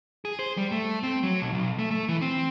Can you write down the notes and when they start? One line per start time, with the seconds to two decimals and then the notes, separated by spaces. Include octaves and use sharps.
0.25 G#4
0.39 C5
0.57 G3
0.72 A3
1.03 C4
1.23 F#3
1.40 B1
1.54 B1
1.79 A3
1.91 A3
2.09 E3
2.22 C4